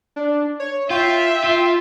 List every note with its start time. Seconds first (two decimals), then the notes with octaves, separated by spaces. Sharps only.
0.16 D4
0.60 C#5
0.91 F4 E5 G5
1.44 F4